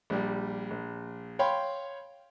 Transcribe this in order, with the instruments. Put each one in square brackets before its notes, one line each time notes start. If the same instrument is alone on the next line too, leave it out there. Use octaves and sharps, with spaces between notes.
[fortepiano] A#1 G3
A#1
C#5 F5 G5 B5 C6